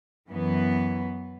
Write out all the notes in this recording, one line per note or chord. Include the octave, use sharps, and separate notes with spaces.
F#2 E3 B3